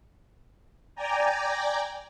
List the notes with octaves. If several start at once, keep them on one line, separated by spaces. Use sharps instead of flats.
D5 G5 G#5 A#5